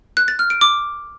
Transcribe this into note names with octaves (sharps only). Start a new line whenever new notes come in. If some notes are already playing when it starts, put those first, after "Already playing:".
F#6
A6
F6
D7
D6